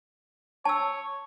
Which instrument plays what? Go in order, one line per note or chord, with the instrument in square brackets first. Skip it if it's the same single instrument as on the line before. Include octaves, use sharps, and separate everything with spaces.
[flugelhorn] C#5 [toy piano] A5 E6